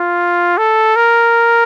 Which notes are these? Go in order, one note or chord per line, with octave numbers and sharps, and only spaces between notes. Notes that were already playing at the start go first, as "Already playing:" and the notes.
Already playing: F4
A4
A#4